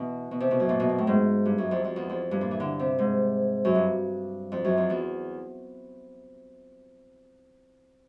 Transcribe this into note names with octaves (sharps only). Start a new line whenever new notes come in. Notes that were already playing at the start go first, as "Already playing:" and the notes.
Already playing: B2 E3
B2
C3
B2
F#2
A#2
B2
A#2
A2
G#2
G2
F#2
F2
F2
E2
F2
G2
A#2
E3
D3
C3
G#2
F#2
G2
F2
F#2
F2
E2